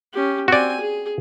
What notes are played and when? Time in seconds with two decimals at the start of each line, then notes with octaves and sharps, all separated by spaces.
0.13 C#4 G4
0.48 C4 F#4 D5 G#5
0.80 G#4